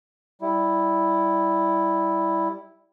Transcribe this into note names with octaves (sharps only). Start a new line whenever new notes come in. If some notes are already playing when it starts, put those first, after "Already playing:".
G3 E4